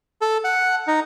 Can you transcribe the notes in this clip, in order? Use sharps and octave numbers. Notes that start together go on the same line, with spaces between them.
A4
F#5
D#4